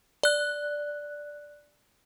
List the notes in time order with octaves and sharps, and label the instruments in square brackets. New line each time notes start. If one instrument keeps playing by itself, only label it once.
[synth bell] D5 F#6